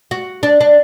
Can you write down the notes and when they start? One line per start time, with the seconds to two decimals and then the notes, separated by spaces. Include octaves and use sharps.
0.11 F#4
0.43 D4
0.61 D4